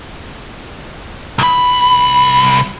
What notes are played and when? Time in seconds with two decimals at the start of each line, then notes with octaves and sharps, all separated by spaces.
1.39 C2 B5